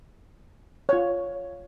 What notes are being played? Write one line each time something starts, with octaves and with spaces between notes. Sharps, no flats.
F4 C#5